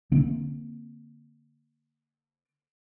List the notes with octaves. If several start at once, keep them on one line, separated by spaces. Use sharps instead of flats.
D3 A#3 C4